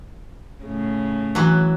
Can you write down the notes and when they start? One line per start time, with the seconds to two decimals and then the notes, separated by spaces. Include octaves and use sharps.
0.64 A2 C#3
1.35 E3 F#3